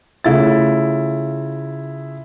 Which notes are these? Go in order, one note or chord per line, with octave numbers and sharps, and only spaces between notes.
C#3 A3 E4 F4 A6